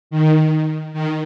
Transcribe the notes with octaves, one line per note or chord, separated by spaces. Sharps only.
D#3
D#3